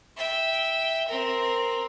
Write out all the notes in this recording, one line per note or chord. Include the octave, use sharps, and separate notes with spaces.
E5 G5
C4 A#4